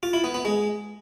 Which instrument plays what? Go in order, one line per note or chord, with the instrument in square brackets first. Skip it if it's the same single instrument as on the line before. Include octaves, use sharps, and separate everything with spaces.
[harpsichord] F4
E4
B3
B3
G#3